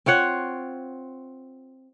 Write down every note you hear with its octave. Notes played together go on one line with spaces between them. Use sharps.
C4 F4 C#5 F#5